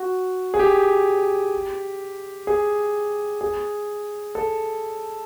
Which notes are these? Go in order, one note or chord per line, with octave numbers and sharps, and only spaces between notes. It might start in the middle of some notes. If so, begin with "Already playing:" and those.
Already playing: F#4
G#4
G4
G#4
G#4
A4